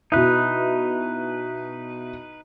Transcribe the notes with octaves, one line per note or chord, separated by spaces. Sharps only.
B2 D#4 E4 B4